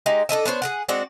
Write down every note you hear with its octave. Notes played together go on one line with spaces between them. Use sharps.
G#3 D#4 G4
D4 A4 D#5 E5
B3 D4 C5 C#5
G#4 A#4 F#5
G#3 C4 D4 F#4